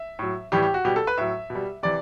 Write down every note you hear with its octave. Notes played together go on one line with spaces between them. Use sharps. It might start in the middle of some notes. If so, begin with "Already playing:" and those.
Already playing: E5
A2 F#3
A2 E3 G3 G4
G4
F#4
B2 G3 G4
A4
B4
A2 F#3 E5
B2
G3
C3 E3 D5